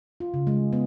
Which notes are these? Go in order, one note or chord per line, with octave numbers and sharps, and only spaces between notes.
F4
C#3
G#3
B3